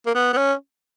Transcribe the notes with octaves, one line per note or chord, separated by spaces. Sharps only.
A#3
B3
B3
C#4